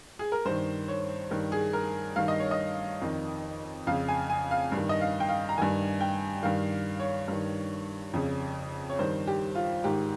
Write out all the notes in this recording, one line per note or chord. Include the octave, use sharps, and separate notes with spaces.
G#4
A#4
G2 D#3 C5
C#5
G2 D#3
G#4
A#4
G2 D#3 F5
D#5
C#5
D#5
F2 D#3
F2 C#3 F5
G#5
G#5
F5
G2
D#3
D#5
F5
G5
F5
A#5
G2 D#3 G#5
G5
G2 D#3 F5
C#5
G2 D#3
F2 C#3
C#5
G2 D#3 C5
G4
F4
G#2 D#3 G4